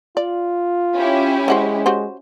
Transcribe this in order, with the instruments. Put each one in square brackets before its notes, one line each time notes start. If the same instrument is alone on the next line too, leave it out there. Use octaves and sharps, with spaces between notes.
[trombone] F4 [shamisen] D5
[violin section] C#4 E4 G4
[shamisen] E3 F#4 C5 [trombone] G#3
[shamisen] F#4 G4 C5